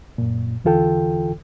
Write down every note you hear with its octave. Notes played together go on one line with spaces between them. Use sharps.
F#2 A#2
E2 D3 E3 F4 A4 G5